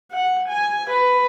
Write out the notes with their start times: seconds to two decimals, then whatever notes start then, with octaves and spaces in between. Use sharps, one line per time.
0.12 F#5
0.49 G#5
0.90 B4